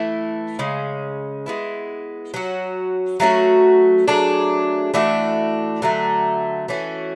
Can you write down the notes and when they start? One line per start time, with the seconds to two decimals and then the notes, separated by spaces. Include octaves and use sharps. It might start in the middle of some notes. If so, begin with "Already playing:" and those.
Already playing: E3 A3 E4
0.59 C#3 G#3 C#4
1.46 G#3 B3 E4
2.34 F#3 C#4 F#4
3.20 F#3 A3 C#4 F#4
4.08 F#3 A3 D4 G#4
4.94 E3 A3 D4 F#4
5.82 D3 F#3 A3
6.68 E3 A3 C#4 F#4